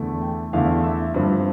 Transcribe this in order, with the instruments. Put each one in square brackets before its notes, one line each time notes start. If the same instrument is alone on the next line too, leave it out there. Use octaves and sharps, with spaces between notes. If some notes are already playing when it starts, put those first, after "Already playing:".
Already playing: [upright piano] E2 D3 A3 E4
G5
E2 D3 A3 E4 F5
E5
G2 F3 C4